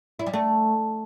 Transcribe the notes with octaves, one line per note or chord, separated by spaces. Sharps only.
E4
G3
A3